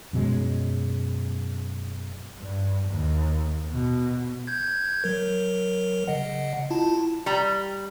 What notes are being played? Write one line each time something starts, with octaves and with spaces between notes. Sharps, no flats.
F#2 B2 F#3 G#3
G2
D#2
B2
G6 G#6
F#3 A#4
C#3 D#5 F#5
E4 F4 A5
G3 A#5